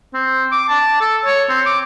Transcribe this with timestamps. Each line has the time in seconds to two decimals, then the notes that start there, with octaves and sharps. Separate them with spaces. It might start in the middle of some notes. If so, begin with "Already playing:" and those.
0.14 C4
0.52 D6
0.69 A5
1.01 A4
1.25 C#5
1.49 C4
1.66 D6